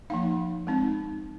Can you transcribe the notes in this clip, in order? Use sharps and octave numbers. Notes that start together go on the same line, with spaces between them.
F3 A#3 D#4 F5
G#3 C4 D#4